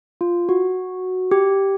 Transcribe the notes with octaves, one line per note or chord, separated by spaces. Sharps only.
F4
F#4
G4